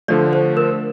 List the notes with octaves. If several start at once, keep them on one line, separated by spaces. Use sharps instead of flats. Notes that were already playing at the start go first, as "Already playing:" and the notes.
D3 F3 A3 D5
C5
A#4